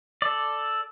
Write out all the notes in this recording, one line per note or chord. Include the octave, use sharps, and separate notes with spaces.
A4 D5